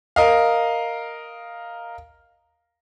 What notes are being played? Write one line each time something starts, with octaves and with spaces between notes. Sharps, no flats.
A#4 D#5 F5